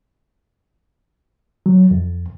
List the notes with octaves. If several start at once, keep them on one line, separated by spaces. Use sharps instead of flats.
F#3
F2